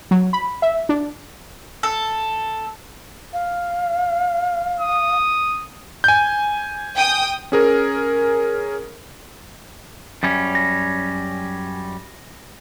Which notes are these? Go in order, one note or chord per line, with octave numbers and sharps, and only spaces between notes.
F#3
B5
E5
D4
A4
F5
D#6
G#5 G6
G5 D#6
C#4 G#4 A#4
F#2 G3 C#4
A#6